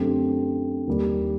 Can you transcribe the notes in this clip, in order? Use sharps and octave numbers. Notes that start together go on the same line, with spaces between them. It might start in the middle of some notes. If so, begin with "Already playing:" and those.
Already playing: F#2 D3 A3 C4 G4
D#2 D#3 G3